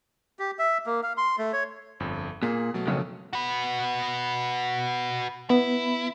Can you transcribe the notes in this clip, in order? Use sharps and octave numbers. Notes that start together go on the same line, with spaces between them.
G4
E5
A#3
F5
C6
A3
C#5
G1 F2
A#2 G#4
B2 F#3 A3
F2 C#3 C#4
F#4 B4
B3 E4